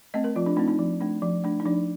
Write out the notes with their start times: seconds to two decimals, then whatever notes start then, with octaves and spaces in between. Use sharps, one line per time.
0.14 A3 C4 D#5
0.24 A#4
0.36 F3 F4
0.46 D4
0.57 A3 C4 D#4
0.68 D#4
0.79 F3
1.01 A3 D4
1.22 F3
1.44 A3 D4
1.60 D#4
1.66 F3 D4